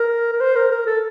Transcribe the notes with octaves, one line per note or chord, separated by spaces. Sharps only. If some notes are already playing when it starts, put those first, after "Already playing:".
Already playing: A#4
A#4
C5
A#4
A#4
A4